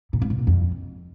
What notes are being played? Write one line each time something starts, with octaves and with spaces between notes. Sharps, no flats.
A#2
G2
B2
A#2
F2